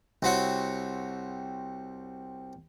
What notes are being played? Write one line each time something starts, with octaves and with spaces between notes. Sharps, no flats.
C2 C4 F#4 C#5